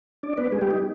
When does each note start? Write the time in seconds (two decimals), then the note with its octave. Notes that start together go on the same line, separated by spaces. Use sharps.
0.23 D4 D5
0.37 B3 B4
0.52 G#3 G#4
0.61 G3 G4
0.71 D#4